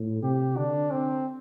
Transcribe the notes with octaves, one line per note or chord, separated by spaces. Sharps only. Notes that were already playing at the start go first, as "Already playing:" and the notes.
Already playing: A2
C3 G4
D3 D4
C4